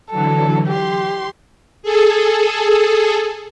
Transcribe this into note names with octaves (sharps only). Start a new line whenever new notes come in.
D3 E3 F#3 A4
G4 C6
G#4 A4